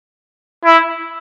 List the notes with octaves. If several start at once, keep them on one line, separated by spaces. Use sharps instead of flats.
E4